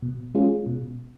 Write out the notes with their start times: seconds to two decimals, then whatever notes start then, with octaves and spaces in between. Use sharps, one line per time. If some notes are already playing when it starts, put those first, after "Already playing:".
0.02 B2
0.35 G#3 C#4 F4 G#4
0.67 B2